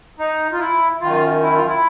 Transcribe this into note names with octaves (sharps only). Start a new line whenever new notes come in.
D#4
F4
E4
F#2 D#3 F4
E4
F4
E4